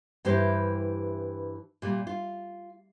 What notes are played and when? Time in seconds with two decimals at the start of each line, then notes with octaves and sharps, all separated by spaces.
0.25 G2 E3 E4 G4 C5
1.82 A#2 G3
2.07 F4